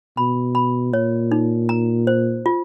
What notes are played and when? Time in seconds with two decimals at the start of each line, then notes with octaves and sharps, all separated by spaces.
0.17 B2 B5
0.55 B5
0.93 A#2 C#5
1.32 D#4
1.69 A#5
2.07 C5
2.46 F4